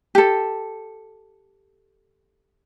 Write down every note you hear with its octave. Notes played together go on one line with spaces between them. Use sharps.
G4 A4